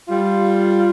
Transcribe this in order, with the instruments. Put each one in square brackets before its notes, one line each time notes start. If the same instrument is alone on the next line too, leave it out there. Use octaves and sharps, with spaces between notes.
[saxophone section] G3 F4